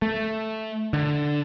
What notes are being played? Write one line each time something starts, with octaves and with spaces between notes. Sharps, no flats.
A3
D3